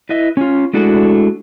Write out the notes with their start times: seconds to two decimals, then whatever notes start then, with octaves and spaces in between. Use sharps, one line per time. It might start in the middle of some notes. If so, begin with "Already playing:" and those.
0.09 E4 B4 D#5 E5
0.37 C#4 F4
0.73 G#3 A3 D4 E4 F#4 A4